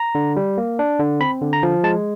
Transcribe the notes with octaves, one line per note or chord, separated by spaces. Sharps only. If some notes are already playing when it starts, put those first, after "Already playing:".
Already playing: A#5
D3
G3
A#3
D4
D3
C4 B5
D3
A#5
F3
G#3 A5